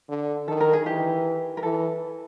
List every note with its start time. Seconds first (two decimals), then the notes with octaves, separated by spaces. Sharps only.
0.09 D3
0.48 D#3 A4
0.60 A#4
0.73 G#4
0.86 E3 G4
1.57 A#4
1.62 E3 A4